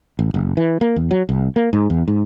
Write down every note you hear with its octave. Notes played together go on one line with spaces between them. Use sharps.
A1
F#1
E3
A#3
E2
F#3
C2
A#3
G#2
E2
G#2